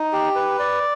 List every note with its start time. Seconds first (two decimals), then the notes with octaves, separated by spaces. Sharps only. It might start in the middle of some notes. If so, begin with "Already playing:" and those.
Already playing: D#4
0.13 G4
0.35 B4
0.59 D5